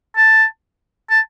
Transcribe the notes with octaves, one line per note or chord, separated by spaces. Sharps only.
A5
A5